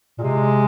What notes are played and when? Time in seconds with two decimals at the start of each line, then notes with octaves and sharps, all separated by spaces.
0.18 A#2
0.23 C3 G#3